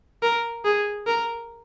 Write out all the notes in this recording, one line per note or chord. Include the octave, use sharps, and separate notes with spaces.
A#4
G#4
A#4